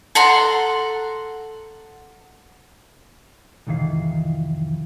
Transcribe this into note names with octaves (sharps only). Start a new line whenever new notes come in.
A4 F#5 A#5 C6
C2 F2 D#3 E3 F5